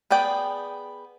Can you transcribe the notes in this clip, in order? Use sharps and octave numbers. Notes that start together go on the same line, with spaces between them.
B3 G#4 D5 G5